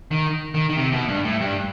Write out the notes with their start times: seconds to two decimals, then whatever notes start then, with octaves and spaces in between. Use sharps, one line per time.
0.11 D#3
0.54 D#3
0.69 D#3
0.76 C3
0.92 B2
1.09 G2
1.24 A2
1.41 G2